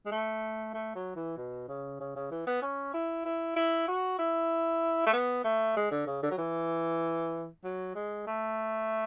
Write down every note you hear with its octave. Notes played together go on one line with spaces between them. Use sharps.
G#3
A3
A3
F#3
E3
B2
C#3
C#3
C#3
E3
B3
C#4
E4
E4
E4
F#4
E4
A3
B3
A3
G#3
D3
C#3
D3
F#3
E3
F#3
G#3
A3